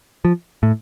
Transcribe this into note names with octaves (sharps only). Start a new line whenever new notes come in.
F3
A2